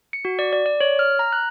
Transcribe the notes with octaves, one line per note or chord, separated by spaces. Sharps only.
C#7
F#4
D5
D5
D5
C#5
F6
A#5
F#6